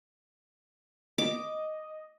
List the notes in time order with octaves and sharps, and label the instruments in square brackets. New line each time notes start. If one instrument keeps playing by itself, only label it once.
[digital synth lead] D#5 [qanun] D6